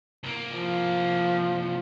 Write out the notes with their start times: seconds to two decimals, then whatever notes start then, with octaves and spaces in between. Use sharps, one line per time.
0.23 C2 A#3
0.55 F3